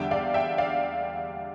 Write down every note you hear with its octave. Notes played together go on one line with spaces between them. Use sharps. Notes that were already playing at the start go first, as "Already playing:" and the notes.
Already playing: E2 D3 G3 E5 G5
D5 F5
E5 G5
D5 F5